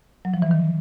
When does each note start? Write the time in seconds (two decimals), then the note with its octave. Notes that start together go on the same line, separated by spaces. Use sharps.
0.25 F#3
0.34 F3
0.42 E3
0.51 D#3